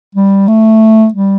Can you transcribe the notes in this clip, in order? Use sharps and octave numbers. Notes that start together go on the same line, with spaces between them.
G3
A3
G3